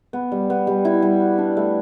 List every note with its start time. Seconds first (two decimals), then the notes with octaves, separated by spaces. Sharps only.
0.13 B3
0.32 G3
0.50 B3
0.67 G3
0.85 E4
1.02 G3
1.20 F#4
1.38 D4
1.57 A3